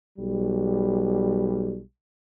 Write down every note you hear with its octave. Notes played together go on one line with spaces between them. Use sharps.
B1 G3